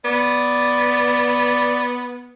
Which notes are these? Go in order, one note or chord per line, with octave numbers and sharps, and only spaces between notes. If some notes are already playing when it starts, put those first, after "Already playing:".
B3 D5